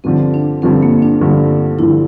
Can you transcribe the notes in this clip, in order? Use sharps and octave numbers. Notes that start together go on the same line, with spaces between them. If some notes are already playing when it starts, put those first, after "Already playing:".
G2 D3 F3 C4
D4
G2 D3 F3 C4
A#3
D4
G2 D3 F3
G2 D3 F3 E4